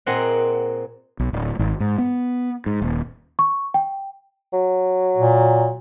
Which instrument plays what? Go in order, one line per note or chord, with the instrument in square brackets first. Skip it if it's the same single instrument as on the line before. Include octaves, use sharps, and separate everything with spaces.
[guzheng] A#2 C4 G#4 D#5 F#5
[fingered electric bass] B1
D1
G#1
G#2
B3
G#2
D#1
[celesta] C#6
G5
[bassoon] F#3
[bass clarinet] A#2